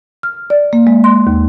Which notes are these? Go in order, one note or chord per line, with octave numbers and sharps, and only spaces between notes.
F6
D5
A#3
G#3
C6
D#2